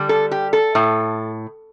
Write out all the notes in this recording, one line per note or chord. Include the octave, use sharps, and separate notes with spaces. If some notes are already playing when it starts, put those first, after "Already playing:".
Already playing: D3 G3
A4
G4
A4
A2